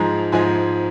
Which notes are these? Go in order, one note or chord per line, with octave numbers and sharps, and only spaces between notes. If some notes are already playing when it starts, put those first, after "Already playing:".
Already playing: G#2 F3 G#3 A#5
G#2 F3 G#3 G#5